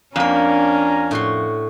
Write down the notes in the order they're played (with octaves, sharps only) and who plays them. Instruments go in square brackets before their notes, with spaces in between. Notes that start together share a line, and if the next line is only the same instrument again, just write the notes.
[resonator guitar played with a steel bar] F2 A#3 [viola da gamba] C#4 D4 [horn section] F5 G#5 A#5
[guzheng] A2 F#4 C6